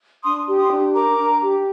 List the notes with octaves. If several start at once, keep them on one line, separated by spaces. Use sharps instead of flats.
D4 C6 D#6
G4
C6 D#6
D4
A#4 A#5 D6
D4
G4